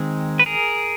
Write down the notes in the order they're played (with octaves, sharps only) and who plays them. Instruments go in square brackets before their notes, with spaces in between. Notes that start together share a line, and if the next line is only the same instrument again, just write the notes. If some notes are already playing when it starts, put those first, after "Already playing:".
Already playing: [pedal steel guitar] D#3 G#3 C4
B4
G#4 A#4